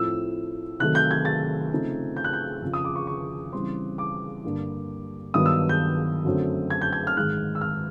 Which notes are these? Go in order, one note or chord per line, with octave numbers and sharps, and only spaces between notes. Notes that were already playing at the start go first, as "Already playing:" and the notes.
Already playing: A2 F3 A3 C4 E6
C3 D#3 F#3 A3 F#6
G6
G#6
A6
C#3 F3 A3 C4 D#4
G6
F#6
G6
F2 C#3 F3
D#6
D6
C#6
C#6
C#3 E3 G3 C4 C6
D6
G2 D3 G3 A#3 D4
G2 D#3 F#3 B3 D#6
E6
G6
F#2 D3 F#3 A3 C4
G#6
G6
G#6
F6
G#2 D#3 G#3 F#6
E6
F6